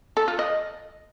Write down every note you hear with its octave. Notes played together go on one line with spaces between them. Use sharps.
A4
F4
D#5